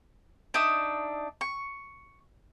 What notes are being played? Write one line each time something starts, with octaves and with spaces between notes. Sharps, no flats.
D4 D#4 E5 D#6
C#6